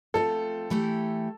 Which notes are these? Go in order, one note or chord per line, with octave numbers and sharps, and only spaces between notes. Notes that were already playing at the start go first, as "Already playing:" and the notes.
F3 A3 C4 F4 A4
E3 A3 E4 G4